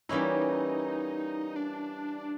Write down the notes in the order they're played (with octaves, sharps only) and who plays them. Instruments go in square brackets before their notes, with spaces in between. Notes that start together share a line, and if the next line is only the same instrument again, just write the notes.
[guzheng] E3 G3 A#3 C#4 E4 [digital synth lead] D#4
[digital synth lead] D4